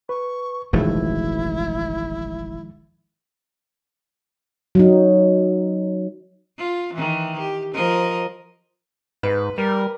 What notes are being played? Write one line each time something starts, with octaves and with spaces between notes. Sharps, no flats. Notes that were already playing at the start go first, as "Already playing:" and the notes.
B4 C#6
E1 A1 D#3 F3 G#3 A3 E4
F#3 D#4
F4
D#3 E3
G4
F3 A#4 D#5
G#2 B4
G3 A#4